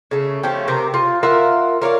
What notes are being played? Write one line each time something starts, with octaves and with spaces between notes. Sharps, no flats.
C#3 A3
F3 A3 C#4 G4
C3 A#4 G5 A#5
F4
F4 A#4 E5 F#5
A#4 C#5 D5 F5